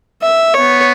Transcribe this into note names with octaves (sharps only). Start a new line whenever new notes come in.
E5
B3 C#5